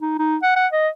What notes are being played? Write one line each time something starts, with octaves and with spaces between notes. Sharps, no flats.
D#4
D#4
F#5
F#5
D#5